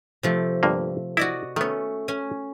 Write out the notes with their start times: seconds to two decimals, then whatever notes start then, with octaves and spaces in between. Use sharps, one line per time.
0.23 C3 F3 A3
0.63 G1 G2 A#3
1.17 E4 F#4 D5 D#5
1.56 D#3 A3 B3 C#4
2.08 C#4 G#5